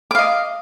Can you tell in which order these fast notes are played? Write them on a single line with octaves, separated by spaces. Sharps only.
D6 F5 D#5